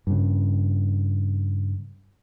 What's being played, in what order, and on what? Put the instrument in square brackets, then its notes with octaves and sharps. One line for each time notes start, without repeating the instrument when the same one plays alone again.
[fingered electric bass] G2 C#3